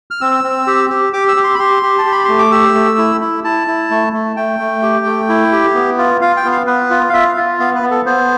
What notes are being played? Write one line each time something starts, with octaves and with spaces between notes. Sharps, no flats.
F6
C4 E6
C4
G4
G4
G4 D6
E6
G4
C6
B5
G4 C6
G4
A5
G4
B5
A3 C6
D6
G4 E6
A3
E4
E4
E4 A5
E4
A3
A3
A3 G5
A3
G4
A3
E4
G4
B3
F4
F4 F5
G5
B3
F5
B3 B4
F4
F5
F4 E5
F5
F4
B3 F5
B4
B3
A4
B3 C5